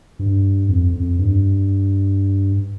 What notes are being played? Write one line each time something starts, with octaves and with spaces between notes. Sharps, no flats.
G2
F2
F2
G2